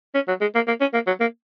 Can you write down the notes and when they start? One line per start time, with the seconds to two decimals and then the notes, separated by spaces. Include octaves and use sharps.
0.14 C#4
0.28 F#3
0.41 G#3
0.55 A#3
0.67 A#3
0.80 C#4
0.93 A#3
1.07 F#3
1.20 A#3